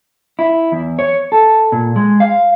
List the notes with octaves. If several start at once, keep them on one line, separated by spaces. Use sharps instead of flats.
E4
E2
C#5
A4
A#2
G#3
F5